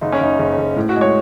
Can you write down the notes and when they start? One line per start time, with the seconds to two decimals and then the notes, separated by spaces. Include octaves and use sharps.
0.01 F#1 D#4
0.12 C#4
0.20 F#1 D#4
0.39 F#1
0.58 F#1
0.76 A2
0.89 F#4
0.96 G#3
1.01 C#5